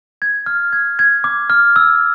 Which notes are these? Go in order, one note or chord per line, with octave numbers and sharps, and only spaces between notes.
G#6
F6
G#6
G#6
D6
F6
E6